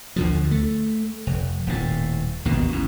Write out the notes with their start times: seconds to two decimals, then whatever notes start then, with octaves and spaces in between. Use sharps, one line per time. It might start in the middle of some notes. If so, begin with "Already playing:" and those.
0.16 D2 D3 F3
0.51 A3
1.27 F1
1.67 D#1 A2
2.45 G#1 D#2 B2 D#3
2.68 A1 G#2